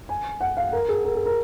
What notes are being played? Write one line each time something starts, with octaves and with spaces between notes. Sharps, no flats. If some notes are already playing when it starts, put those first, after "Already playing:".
G#5
F#5
F5
A#4
G#4
A#4
G#4
A#4